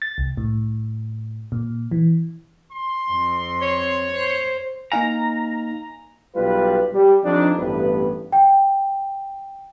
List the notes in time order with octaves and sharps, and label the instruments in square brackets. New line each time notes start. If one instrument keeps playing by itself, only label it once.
[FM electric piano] A6
C2
A2
A#2
E3
[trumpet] C6
[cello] F2 C4
[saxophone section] C#5
[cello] C5
[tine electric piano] A#3 D#4 F5 [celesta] G#5 [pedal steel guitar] A#5
[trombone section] B1 G3 F4 B4
G3
F2 D4 D#4
A1 G2 G3 A3 B3 B4
[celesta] G5